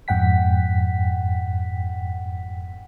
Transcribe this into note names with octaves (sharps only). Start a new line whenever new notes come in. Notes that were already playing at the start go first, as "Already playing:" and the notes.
F2 G#2 F#5 G5 B6